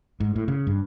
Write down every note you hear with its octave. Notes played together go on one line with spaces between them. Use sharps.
G#2
A2
C#3
G2